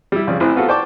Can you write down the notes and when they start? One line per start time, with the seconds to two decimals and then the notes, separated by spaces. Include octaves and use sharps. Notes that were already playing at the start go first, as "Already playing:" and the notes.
0.12 G3 E4
0.27 F2 C#3 D5
0.40 A1 E3 C4
0.56 B3 F4 F#4 A4
0.68 C5 D5 G5 A5 C#6 D6